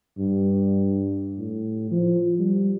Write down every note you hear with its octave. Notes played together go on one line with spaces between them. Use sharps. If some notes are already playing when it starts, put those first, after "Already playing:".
G2
A2
F3
G3